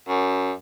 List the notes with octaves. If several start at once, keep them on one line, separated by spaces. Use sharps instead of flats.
F#2